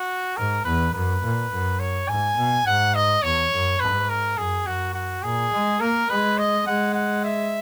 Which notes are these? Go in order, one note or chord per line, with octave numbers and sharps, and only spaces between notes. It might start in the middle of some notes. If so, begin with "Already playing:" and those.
Already playing: F#4
G#2 A#4
E2 B4
F#2 B4
A#2
F#2
C#5
G#2 G#5
B2
G#2 F#5
D#5
E2 C#5
F#2
G#2 B4
A#4
F#2 G#4
F#2 F#4
F#4
A#2 G#4
G#3
A#3 A#4
G#3 B4
D#5
G#3 F#5
F#5
E5